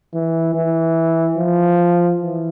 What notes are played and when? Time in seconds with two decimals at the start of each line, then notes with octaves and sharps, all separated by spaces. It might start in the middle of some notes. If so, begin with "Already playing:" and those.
0.14 E3
0.54 E3
1.37 F3
2.20 E3